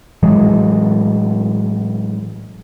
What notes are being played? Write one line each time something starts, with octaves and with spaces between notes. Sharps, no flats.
A2 E3 F#3 G#3